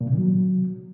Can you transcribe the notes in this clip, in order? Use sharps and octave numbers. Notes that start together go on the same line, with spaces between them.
A#2
C3
D#3
F#3